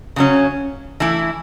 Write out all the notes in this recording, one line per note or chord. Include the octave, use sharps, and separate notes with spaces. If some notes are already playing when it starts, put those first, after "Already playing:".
C#3 F#3 C#4
E3 A3 E4